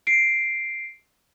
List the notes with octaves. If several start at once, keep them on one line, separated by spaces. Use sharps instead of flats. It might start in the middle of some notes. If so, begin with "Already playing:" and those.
C7 D7